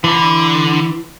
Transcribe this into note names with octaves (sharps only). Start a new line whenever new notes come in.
D3 E3 B5